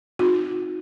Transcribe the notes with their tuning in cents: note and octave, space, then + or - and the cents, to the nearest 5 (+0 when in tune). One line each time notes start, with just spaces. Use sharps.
C4 +0 D#4 +0 F#4 -45